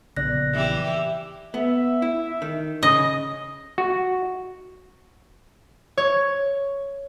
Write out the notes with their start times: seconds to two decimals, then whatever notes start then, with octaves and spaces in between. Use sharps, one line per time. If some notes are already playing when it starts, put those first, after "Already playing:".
0.17 A#1 C#3 B3 D5 F#6 A#6
0.54 E3 E4 G4
1.54 B3 E5
2.02 E4
2.42 D#3
2.83 C#3 D#5
3.78 F#4
5.97 C#5